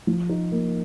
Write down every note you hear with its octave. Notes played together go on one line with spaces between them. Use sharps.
F3
D#4
A#3